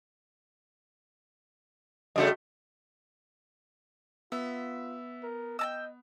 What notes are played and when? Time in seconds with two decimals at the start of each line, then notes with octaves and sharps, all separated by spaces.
2.16 G2 C#3 A3 F#4 D#5
4.32 B3 F4 E5
5.23 A#4
5.59 D#5 G5 A5 E6